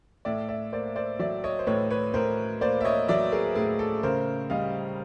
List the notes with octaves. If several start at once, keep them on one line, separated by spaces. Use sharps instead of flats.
A2 D5 E5
D5 E5
A#3 C5 D5
C5 D5
F#3 D5 E5
C#5 D#5
C5
A2 B4 C#5
B4 C#5
A2 A#4 C5
A#3 C5 D5
E5
C#5 D#5
F#3 D5 E5
G#4 A#4
A2 G#4
A4
C#3 A#4 C5
G3 D#5 F5